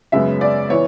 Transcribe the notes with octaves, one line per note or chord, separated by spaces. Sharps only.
F#2 C#3 G#3 B3 E5
D5
E3 B3 C#5